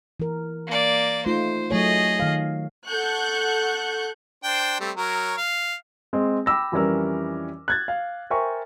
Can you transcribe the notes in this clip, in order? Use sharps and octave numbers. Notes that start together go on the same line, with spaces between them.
E3 A#4
A#3 D5
A3 D#4 F4 C5
F#3 A3 G#4 C#5 D#5
D#3 F5
A4 F#5 C#6 F#6 G6
D4 C5 G5
G3 A3 C4
F#3 A#4 C#5
F5
G#3 C4
G5 B5 D6 E6 A#6
F2 E3 G3 C#4 A#4 E6
F#6 G#6 A6
F5
A#4 C5 E5 G5 G#5 C#6